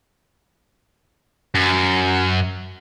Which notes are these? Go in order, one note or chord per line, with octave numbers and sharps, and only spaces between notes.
F#2